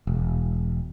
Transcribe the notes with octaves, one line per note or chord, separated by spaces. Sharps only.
E1